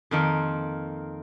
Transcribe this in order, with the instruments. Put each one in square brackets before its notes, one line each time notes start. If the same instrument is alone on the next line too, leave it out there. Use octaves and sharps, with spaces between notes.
[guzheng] F2 D#3 A#3 F4